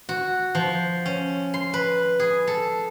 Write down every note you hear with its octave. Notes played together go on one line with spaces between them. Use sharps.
F#4
F3
C#4
C6
B4
G#4
A4